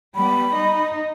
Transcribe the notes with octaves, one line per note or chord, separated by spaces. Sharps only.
G3 B3 B5
D#4 D#5